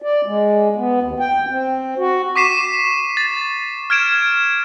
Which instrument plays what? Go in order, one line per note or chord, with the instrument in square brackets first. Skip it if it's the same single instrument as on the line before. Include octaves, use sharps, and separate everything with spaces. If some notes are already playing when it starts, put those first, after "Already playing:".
[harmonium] D5
G#3
B3
D#2
G5
C4
F#4
[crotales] C#6 D6 B6 C7 D#7 E7
A6
F6 G#6 D7 E7